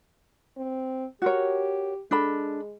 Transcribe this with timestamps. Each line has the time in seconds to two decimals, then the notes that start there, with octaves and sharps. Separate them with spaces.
0.57 C4
1.22 F#4 G4 A#4 C#5
2.11 G#3 D4 A4 B5